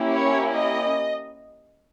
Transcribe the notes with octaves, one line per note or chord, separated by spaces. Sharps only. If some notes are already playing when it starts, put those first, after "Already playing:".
Already playing: A#3 C#4 E4 G4
C#5
D#5